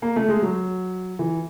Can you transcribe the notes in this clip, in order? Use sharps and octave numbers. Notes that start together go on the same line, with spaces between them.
A#3
A3
G#3
F#3
E3